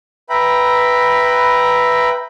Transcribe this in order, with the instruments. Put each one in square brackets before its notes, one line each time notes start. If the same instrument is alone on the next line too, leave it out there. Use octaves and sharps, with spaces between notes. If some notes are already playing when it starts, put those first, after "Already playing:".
[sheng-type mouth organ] B4 E5 G5 A#5 B5